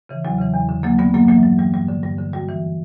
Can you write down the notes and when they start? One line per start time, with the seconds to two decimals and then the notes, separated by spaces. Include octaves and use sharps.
0.09 C#3 E3
0.25 E2 F#3
0.38 C#3 E3
0.54 E2
0.69 D3
0.83 E2 F#3 A#3
0.98 D3 G3 B3
1.14 G2 F#3 A#3
1.28 E3 F#3 A#3
1.43 G2 F#3
1.58 E3 G3
1.74 G2 G3
1.89 D3
2.03 G2 G3
2.18 D3
2.33 F#2 G3
2.48 E3